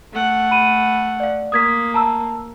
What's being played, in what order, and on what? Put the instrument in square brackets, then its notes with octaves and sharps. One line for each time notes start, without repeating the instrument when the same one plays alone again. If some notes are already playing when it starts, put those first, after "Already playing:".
[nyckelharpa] A3 F#5
[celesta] B5 D#7
D5 F5
[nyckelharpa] A#3 [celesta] D#6 G#6 B6
[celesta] A5 A#5 E6